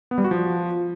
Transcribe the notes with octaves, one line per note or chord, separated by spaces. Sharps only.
B3
G3
F#4
F3